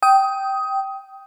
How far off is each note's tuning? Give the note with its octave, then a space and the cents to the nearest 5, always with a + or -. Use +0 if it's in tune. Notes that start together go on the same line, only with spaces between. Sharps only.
G5 -10 D#6 +15